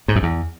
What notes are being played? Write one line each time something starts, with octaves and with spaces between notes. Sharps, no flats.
G#2
F#2
E2